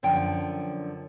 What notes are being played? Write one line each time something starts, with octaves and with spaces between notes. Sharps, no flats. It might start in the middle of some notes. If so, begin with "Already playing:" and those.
F#2 D3 F3 G5